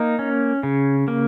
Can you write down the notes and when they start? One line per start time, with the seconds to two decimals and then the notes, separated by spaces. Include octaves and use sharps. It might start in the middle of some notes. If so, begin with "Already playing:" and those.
Already playing: A#3 D#4
0.19 C#4
0.63 C#3
1.08 A#3